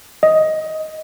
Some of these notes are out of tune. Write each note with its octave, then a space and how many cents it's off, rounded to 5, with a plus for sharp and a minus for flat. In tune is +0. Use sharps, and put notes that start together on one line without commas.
D#5 +10